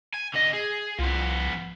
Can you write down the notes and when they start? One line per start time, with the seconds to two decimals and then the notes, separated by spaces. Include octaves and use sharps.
0.14 G#5
0.34 D3 D#5
0.53 G#4
0.99 C2 F3 B3